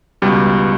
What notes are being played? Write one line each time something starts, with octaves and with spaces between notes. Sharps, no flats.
C#2 B2 G3